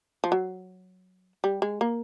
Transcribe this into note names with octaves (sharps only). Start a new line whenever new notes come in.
F3
F#3
G3
G#3
A#3